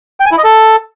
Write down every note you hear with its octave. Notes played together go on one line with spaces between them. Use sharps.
G5
G#5
E4
D#5
A4